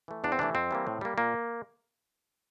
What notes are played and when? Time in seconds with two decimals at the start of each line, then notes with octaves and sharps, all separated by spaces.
0.08 E3 A3
0.24 E2 D4
0.32 C4
0.39 C3 E3 A3 D4
0.55 F2 C4
0.71 E3 G3 A#3
0.87 A2
1.01 G3 A#3
1.18 A#2 A#3